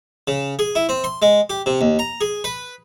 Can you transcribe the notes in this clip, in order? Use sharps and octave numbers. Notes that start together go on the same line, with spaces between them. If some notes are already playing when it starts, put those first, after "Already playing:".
C#3
G#4
E4
C4
C6
G#3
G4
C3
D#2
A#5
G#4
B4